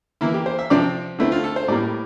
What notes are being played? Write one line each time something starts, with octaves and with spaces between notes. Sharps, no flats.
E3 A#3 E4
G4
C5
E5
C3 F3 C4 D5
D3 A3 C4 E4
F4
A4
C5
A2 G3 A#3 D5